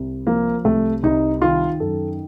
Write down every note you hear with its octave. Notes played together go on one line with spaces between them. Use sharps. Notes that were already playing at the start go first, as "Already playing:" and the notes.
Already playing: C2
F3 A#3
C2 A3
C2 D#4
D#3 F4
F#2 A4